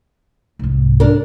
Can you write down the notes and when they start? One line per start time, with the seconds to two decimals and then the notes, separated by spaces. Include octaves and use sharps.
0.59 C2 G#2
1.00 D4 A#4